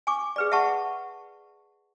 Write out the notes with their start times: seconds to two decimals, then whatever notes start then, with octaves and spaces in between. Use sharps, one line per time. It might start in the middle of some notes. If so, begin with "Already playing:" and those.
0.07 G#5 C#6 D6
0.36 G#4 B4 D5
0.52 E5 F#5 A5 C#6